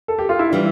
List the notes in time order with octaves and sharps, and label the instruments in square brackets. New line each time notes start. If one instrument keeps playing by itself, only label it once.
[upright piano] A4
G4
F4
E4
D4
[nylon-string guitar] E3 G3